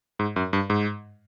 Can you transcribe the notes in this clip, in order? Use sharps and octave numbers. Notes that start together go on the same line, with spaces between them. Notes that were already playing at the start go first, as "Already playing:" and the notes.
G#2
F#2
G2
G#2